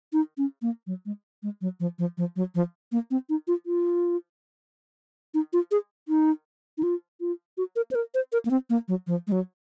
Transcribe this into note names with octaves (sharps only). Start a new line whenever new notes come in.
D#4
C#4
A#3
F#3
G#3
G#3
F#3
F3
F3
F3
F#3
F3
A#3
C4
D#4
F4
F4
D#4
F4
G#4
D#4
D#4
F4
F4
F#4
A#4
C5
A#4
C5
A#4
A#3
C4
A#3
F#3
F3
G#3
F#3